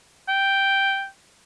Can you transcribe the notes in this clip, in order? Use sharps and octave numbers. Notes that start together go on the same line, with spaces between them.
G5